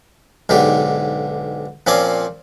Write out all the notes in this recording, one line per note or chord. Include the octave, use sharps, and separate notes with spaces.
B1 G#2 D3 G4
A#2 F3 C4 C#4 D5